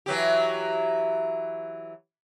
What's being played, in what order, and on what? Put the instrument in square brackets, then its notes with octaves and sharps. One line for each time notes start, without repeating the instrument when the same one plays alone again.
[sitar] E3 F#3 G4